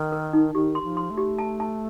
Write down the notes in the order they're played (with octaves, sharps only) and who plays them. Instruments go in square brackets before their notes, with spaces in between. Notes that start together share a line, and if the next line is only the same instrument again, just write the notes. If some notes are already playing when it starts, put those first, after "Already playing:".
Already playing: [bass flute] D#3
[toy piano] A#4
D#4
[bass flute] D#3 [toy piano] G4
[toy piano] C6
[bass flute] F3
[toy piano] C6
[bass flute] A3
[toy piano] G4
A5
A5